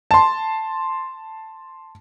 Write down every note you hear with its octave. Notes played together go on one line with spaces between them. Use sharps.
A5 C6